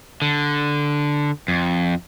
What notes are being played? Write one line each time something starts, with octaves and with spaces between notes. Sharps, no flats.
D3
F2